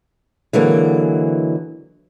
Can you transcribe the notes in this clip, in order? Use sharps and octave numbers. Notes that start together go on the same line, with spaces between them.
D3 E3 F#3 G#3 A#3